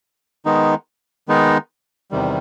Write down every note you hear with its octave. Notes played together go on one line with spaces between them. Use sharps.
D#3 G#3 B3 D#4
D#3 G#3 B3 D#4
E2 C3 D#3 G3